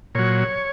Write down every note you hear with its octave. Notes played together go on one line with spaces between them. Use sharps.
A#2 F#3 C#5